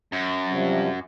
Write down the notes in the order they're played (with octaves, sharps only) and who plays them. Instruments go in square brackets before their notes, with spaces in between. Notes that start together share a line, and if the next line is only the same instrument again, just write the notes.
[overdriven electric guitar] F#2
[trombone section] C3 F3 G3